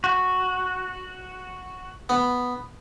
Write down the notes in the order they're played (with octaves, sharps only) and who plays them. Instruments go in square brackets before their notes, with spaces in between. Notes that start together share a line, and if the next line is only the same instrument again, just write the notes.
[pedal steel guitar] F#4
[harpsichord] B3